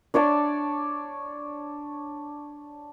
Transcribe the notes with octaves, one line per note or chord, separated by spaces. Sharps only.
D4 C#5 D5 A5